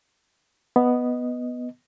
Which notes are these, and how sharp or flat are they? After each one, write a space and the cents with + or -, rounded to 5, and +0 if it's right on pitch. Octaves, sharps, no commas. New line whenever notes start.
B3 +0 D#5 +0